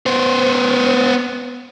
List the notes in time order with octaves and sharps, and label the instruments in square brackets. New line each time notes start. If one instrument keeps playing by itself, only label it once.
[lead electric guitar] B3 C5